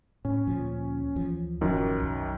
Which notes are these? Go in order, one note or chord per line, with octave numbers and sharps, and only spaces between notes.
A2 C#4
D2 A#2 F3
D2 E3 F3
D1 F#2 D#3 F3
B1